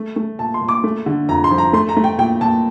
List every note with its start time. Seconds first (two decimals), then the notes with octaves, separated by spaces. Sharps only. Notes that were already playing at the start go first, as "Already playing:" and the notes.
Already playing: A3
0.16 A3
0.39 A#2 A5
0.54 C6
0.61 A#2
0.69 D6
0.84 A3
1.06 D3
1.29 F2 A#5
1.44 C6
1.51 F3
1.58 A#5
1.73 A3 C6
1.89 A#5
1.97 A3
2.04 G5
2.18 A#2 G5
2.41 A#2 A5